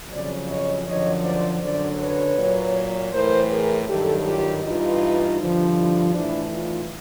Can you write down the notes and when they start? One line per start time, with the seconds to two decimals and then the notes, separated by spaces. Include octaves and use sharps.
0.10 F2 C#3 F#3 C5 D5
0.48 C#5 D#5
0.86 F#2 D3 F3 C#5 D#5
1.24 C5 D5
1.61 F#2 D3 F#3 C5 D5
1.99 B4 C#5
2.38 A#2 F#3
3.12 A2 E3 A#4 C5
3.50 G#4 A#4
3.88 G2 D#3 F#3 G4 A4
4.26 F4 G4
4.64 G2 E3 D#4 F4
5.40 G2 D3 F3
5.77 D4 E4
6.15 A2 E3 D4 E4
6.52 D#4 F4